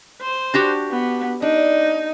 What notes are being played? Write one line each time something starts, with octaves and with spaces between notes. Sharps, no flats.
C5
D4 F#4 G4
B3
D4 D#4